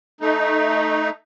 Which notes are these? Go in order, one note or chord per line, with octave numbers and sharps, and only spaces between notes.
A3 D#4